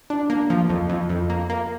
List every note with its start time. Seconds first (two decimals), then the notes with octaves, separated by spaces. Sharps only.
0.10 D4
0.30 A#3
0.50 F3
0.69 F2
0.89 F2
1.09 F2
1.30 A#3
1.50 A#3